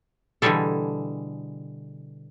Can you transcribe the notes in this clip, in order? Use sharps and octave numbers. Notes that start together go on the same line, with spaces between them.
B2 D3 E3 G3 G#4 A4